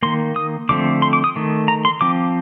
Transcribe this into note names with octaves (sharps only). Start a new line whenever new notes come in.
D#3 A#3 C6
D#6
D3 F3 A3 C4 D6
C6
D6
D#6
D#3 A3
A#5
C6
F3 C4 D6